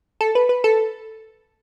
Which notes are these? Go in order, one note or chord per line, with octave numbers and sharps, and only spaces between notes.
A4
B4
B4
A4